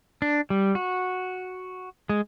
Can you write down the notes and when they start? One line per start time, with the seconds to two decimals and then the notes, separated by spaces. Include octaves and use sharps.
0.22 D4
0.50 G3
0.75 F#4
2.09 G#3